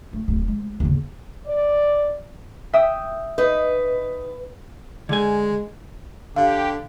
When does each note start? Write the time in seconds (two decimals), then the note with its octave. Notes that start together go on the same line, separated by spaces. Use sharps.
0.13 A3
0.28 D1 D#4
0.48 G#3
0.80 D#2 C#3
1.47 D5
2.73 E5 G5 D#6
3.38 D#4 B4 D#5
5.09 D3 G#3 G#5
6.36 D3 G4 F5